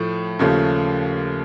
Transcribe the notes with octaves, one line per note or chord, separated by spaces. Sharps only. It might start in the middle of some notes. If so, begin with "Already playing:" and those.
Already playing: A2 F3 A3
D#2 C#3 F3 A3